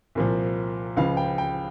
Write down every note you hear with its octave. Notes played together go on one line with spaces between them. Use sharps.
C2 A#2 F3
C#2 C#3 F3 F5
G5
G5